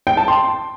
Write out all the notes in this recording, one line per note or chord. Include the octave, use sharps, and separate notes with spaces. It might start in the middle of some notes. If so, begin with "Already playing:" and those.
G5
A5
C6